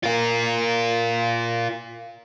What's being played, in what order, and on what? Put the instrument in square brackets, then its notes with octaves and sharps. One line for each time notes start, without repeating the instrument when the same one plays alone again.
[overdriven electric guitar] F4 A#4